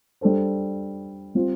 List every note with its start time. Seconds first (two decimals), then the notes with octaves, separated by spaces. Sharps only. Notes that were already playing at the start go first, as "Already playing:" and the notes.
0.21 G3 D4 A4 C5
1.35 G3 C4 F4 C5